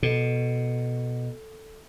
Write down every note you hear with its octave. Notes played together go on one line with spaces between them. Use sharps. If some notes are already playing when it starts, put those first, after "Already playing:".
B2 A4